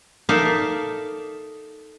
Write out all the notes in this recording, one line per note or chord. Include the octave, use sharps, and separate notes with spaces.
D#4 A4 A#4 D5 E5 F5